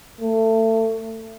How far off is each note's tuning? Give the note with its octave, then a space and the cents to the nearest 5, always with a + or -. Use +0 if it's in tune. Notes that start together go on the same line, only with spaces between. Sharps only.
A3 +25